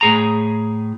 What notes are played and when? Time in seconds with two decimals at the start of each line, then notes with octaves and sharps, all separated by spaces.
0.01 A2 G#4 A#5